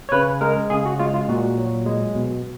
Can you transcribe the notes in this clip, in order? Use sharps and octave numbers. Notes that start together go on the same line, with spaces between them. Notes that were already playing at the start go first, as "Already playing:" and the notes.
C#5
C#3 B4
G#3 A#4
C#3 G#4
F#4
G#3 F4
F4
A#2 F#4
F#3
G#3
B2